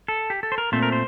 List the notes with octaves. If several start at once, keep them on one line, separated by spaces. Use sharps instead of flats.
A4
G4
A4
C5
A#4
A#2 A3 C4 C5
A#4
C5